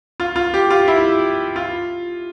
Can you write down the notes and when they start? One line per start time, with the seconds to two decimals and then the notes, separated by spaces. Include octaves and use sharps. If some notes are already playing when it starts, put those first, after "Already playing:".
0.20 F4
0.36 F4
0.54 G4
0.70 F4
0.88 E4
1.56 F4